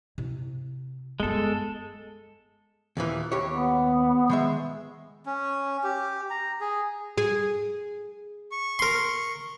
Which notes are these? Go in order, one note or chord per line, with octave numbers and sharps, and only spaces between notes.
C3 E4
G2 G#3 B3 A4
D#2 A#2 E3
D#2 G4 C#5
B3
D#3 G#3 E5
C#4
G4
A#5
G#4
G#4
C#6
A#4 C6